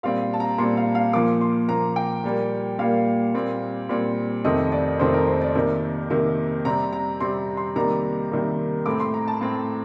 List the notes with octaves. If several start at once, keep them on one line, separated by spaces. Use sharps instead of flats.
A#2 G3 C4 F5
A5
A#5
A#2 G3 C4 C6
F5
F5
A#2 F3 A#3 D6
C6
A#2 F3 A#3 A#5
G5
A#2 G3 A#3
A#2 G3 A#3 F5
A#2 G3 C4
A#2 G3 C4
F2 C3 D#3 A3 C4 D#5
D5
F2 C3 D#3 A3 C4 C5
A#4
C5
D5
C3 D#3 A#3
C3 D#3 A#3
C3 G3 C4 A#5
A#5
C3 G3 C4 C6
C6
C3 D#3 G3 A#3 A#5
C3 D#3 G3 A#3
A2 A3 C4 D6
C6
A#5
A5
A2 A3 C4